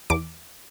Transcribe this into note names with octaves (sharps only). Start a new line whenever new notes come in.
E2 D6